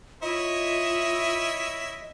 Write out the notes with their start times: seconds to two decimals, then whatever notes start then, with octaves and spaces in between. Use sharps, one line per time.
0.22 E4 F4 C#5 D#5 E5